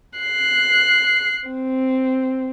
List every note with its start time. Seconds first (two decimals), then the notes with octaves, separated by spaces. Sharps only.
0.19 F#6 C7
1.49 C4